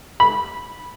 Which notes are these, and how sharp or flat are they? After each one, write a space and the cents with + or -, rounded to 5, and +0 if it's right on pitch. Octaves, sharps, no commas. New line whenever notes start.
B5 -10